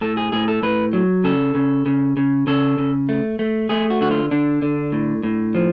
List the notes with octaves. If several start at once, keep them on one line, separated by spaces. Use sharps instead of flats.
A2 A4
G#4
A2 G#4
A4
A2 B4
F#3
C#3 A4
C#3
C#3
C#3
C#3 A4
C#3
A3
A3
A3 G#4
F#4
D3 F#4
F4
D3 D4
D3
A2
A2
F3